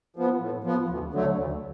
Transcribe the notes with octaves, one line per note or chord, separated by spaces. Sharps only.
F3 B3
A2
F3 B3
D2
D3 F#3 A3
D2